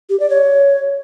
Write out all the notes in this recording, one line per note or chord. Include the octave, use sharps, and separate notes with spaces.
G4
D5
C#5